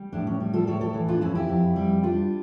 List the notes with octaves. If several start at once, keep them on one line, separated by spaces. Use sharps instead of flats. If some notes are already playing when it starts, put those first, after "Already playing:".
Already playing: G3
A2 D4
C#4
G3
F4 A4
A2 A4 C#5
A4 C#5
E3
D4 F4
F2 C#4 E4
E4 G4
F2
G3
G3 D4 F4